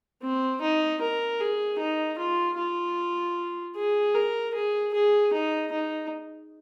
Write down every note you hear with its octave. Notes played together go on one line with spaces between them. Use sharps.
C4
D#4
A#4
G#4
D#4
F4
F4
G#4
A#4
G#4
G#4
D#4
D#4